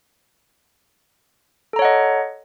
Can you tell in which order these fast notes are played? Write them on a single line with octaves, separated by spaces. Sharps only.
A4 A#5 C#5 F#5 D#5